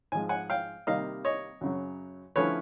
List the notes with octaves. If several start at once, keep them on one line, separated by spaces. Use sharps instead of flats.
G#2 F3 G#3 G#5
F#5 G#5
F5 G5
C3 D#3 G3 A#3 D#5 F5
C#5 D#5
F#2 C#3 F#3
D3 F3 A3 C#4 E4 B4 C#5